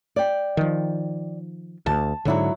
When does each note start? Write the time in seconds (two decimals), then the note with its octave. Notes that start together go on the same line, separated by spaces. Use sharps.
0.16 D5 G5
0.57 D#3 F3
1.86 D2 A5
2.25 G#2 D3 F#3 E4 C#5